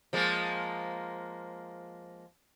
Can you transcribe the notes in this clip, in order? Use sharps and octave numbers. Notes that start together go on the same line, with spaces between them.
F3 G#3 A#3